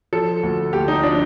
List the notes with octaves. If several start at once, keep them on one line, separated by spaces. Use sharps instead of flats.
F3 A4
D2
D2 G4
D#4
F3 D4